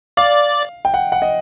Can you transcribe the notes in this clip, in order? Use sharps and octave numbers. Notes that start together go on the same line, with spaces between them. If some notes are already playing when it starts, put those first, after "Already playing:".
D5 F5
G5
F#5
F#5
D#5